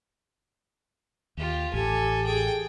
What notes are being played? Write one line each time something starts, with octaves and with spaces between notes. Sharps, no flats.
D#2 F4 G4
A1 G4 A4 G#5
G#4 G5